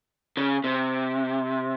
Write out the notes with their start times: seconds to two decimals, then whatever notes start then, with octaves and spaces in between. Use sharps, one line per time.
0.37 C#3
0.64 C3